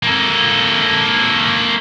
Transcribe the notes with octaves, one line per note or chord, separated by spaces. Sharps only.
A#3 A4